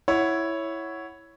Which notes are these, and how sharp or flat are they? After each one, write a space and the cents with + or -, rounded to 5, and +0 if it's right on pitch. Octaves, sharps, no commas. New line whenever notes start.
E4 +0 C#5 +0 F#5 +0